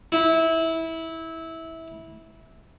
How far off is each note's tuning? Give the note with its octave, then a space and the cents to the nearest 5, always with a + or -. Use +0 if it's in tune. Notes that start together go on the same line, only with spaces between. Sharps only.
E4 -20